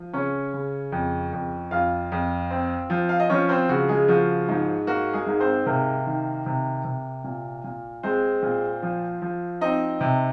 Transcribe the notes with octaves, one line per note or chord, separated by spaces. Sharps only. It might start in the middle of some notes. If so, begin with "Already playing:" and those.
Already playing: F3
C#3 C#4 C#5
C#3
F2
F2
F2 F4 F5
F2
C4
F3
F5
D#5
F3 C#4 C#5
C4 C5
C#3 F#4
G#3 G#4
F3 F#4
G#2
A#3 F#4
G#3 G#4
G#2
C4 C5
C3 A#3 A#4
D#3
C3
C3
A#2
A#2
G#3 C4 C5
A#2
F3
F3
C4 D#4 D#5
C3